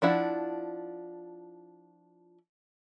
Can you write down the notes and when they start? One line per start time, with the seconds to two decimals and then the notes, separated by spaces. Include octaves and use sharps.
0.02 F3 D4 E4 F#5